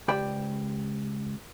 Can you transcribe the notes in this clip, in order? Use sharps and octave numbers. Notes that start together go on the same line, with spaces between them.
C#2 G4 C5 D5 G5 B5